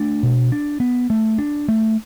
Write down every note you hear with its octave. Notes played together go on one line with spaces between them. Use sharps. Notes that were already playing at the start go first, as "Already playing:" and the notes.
Already playing: A3 D4
B2
D4
B3
A3
D4
A3